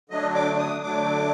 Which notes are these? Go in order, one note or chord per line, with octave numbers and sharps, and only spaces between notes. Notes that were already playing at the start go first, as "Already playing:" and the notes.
D3 F#3 A3 D4 D#5
D6
D#6
D3 F#3 A3 D4 D6